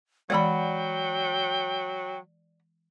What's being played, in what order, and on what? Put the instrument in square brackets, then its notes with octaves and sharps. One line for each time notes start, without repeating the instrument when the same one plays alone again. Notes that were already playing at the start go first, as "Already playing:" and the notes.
[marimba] E3 G#3 [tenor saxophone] F#3 [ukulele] D5 F#5 B5 [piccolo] G5